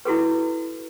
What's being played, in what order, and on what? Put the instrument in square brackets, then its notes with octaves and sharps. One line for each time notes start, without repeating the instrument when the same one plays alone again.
[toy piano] E4 F#4 A4 B4